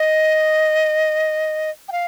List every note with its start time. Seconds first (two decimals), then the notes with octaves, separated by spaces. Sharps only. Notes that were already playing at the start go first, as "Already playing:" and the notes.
Already playing: D#5
1.88 G5
1.92 F5